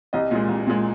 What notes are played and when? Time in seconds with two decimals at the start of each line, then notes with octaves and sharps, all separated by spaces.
0.13 C2 D#5
0.31 A#2 G#3
0.49 C2
0.67 A#2 G#3